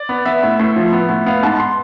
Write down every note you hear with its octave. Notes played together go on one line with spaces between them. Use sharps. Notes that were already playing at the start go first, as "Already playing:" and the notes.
Already playing: D5
B3
B3 E5
A2
A2
F3
B3
A2
B3 F5
G#2 A5
C6